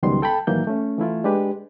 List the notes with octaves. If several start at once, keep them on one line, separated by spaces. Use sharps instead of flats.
C#2 D#3 F#3 G3 B3 C6
A4 G5 A5 B5
A2 D#3 E3 F#3 A#3 G6
A3 C#4
E3 A3 E4 F4
G#3 D4 G4 B4